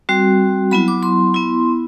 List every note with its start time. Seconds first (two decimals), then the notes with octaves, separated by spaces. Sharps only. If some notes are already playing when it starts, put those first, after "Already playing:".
0.09 G3 C4 F#4
0.71 F#3 B3 E4 B5
0.88 D6
1.03 C6
1.34 B3 E4